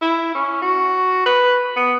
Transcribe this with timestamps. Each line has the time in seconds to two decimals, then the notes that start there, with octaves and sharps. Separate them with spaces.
0.02 E4
0.35 C#4
0.62 F#4
1.26 B4
1.76 B3